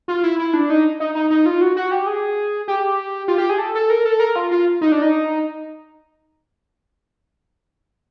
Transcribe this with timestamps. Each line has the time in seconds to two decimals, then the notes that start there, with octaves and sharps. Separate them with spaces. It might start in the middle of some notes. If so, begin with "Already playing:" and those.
0.08 F4
0.23 E4
0.39 E4
0.53 D4
0.70 D#4
1.00 D#4
1.15 D#4
1.30 D#4
1.46 F4
1.61 F#4
1.76 F#4
1.91 G4
2.07 G#4
2.68 G4
3.28 F4
3.38 G4
3.49 G#4
3.58 A4
3.75 A4
3.90 A#4
4.05 A4
4.20 A#4
4.36 F4
4.51 F4
4.81 D#4
4.92 D4
5.02 D#4